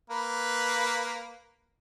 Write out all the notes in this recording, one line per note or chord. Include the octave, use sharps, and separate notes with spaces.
A#3 B4